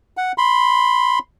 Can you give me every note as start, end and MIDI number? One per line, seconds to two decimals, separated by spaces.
0.17 0.32 78
0.38 1.19 83
0.38 1.19 84